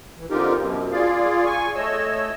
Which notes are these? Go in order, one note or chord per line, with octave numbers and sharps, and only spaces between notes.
E3
D3 C4 D#4 F4 G4 A#4
F#2 B2
F4 G#4 D5 F5
G#5 C#6
A3 C#5 D#5 E6